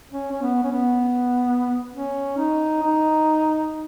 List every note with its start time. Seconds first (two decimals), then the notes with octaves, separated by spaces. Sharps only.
0.11 C#4
0.32 C#4
0.42 B3
0.63 C#4
0.71 B3
1.93 C#4
2.38 D#4
2.83 D#4